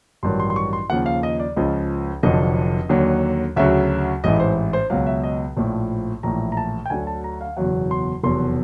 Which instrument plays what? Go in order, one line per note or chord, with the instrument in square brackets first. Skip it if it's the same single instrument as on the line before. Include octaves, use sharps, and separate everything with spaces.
[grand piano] A1 G2 D#3 F#3 C6
C6
C6
C#6
C6
D#2 C#3 F3 F#5
F5
D#5
D5
C#2 C#3 F3 D#5
F1 F2 D3 F#3 D#5
D#2 D3 F#3
D2 C#3 F#3 E5
A1 G#2 E3 D#5
C5
C5
C#2 B2 F#3 F5
E5
D#5
A#1 A2 F3
A#1 A2 E3 A#5
A#5
A5
G5
D2 D3 F#3 G#5
A5
A#5
F5
F#1 E2 B2 F#3 F#5
C6
F1 E2 B2 F#3 C6